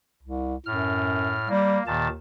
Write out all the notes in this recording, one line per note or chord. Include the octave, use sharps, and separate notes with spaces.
C2
F#2 A2 F6
G3 A#3
D#2 A#2 D#3 A5